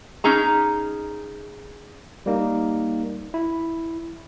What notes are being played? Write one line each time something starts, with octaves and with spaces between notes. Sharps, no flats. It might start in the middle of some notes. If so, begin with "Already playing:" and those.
C#4 D#4 G#4 A#5
G3 A#3 D#4
E4